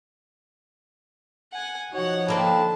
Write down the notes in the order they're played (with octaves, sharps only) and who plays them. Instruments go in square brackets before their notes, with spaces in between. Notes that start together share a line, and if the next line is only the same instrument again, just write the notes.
[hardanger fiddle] F#5 G#5
[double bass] F3 D#4 [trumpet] F#4 [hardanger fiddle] C#5 F#5
[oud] D3 A#3 C4 [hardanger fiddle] A5 [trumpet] B5